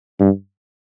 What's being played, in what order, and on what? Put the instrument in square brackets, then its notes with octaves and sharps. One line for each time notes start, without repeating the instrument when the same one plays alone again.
[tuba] G2